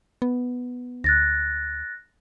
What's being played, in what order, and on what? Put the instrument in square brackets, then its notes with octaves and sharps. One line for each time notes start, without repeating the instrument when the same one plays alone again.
[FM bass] B3
[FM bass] D2 [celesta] F#6 A6 A#6